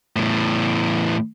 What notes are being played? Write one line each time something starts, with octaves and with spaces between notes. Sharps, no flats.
E2 A2